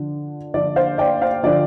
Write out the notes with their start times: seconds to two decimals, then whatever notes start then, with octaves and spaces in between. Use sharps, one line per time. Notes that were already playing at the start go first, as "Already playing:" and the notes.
Already playing: D3 F3 D4
0.54 D3 F3 D4 F4 D5
0.76 C5 F5
0.98 D5 G5
1.22 C5 F5
1.43 D3 F3 D4 F4 D5